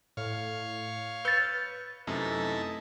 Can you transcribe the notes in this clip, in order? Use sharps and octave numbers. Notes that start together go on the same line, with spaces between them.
A2 C#5 F5
B4 E6 G6 A6 C#7
F#2 C3 A3 D#4 E4 A4